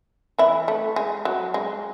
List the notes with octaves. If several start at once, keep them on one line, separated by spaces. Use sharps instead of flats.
E3 E4
A3
G#3
F#3
G#3